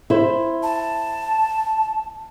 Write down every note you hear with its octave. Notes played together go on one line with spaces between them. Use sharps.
E4 C5
A5